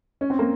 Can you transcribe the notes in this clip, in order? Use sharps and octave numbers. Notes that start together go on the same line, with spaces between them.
C#4
C4
A#3